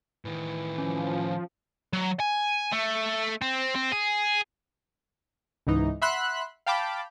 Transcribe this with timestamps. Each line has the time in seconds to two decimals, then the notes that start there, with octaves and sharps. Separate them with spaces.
0.25 A2 D#3 E3
0.78 F3 C#4
1.93 F#3
2.20 G#5
2.72 A3
3.42 C4
3.75 C4
3.92 G#4
5.67 C#2 G#2 E3 D#4
6.02 E5 F#5 B5 C6 E6 F#6
6.66 F5 G5 A5 B5 D6